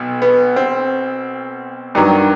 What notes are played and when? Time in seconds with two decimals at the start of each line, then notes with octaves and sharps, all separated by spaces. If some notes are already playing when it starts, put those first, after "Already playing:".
Already playing: B1 B2
0.22 B3
0.56 C4
1.95 G2 D#3 F#3